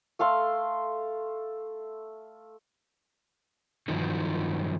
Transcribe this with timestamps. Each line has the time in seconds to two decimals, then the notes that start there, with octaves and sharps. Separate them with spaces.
0.19 A3 A4 F5 C6
3.88 G2 D#3 F3 F#3 D#4